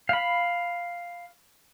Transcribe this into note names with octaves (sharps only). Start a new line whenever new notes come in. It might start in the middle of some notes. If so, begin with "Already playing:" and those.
F5 B5